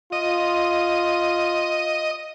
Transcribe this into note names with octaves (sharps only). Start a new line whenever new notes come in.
F4 D#5